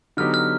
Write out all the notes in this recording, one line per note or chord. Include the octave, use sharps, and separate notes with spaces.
D3 F#3 B3 D#4 G4 F6
F6